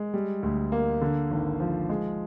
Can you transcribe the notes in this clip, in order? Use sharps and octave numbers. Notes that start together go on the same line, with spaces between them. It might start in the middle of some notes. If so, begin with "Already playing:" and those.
Already playing: G#3
G3
D2
A#3
D3
G#1
F3
G#3